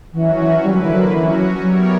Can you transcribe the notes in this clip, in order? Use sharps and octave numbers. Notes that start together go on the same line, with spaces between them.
E3 F#3 C#4 F#4
E3
D3 G3 A#3 E4 B4
F#3
E3
F#3
E3 F#3 C#4 F#4
F#3
F#3 G3 B3 E4 A#4 C#5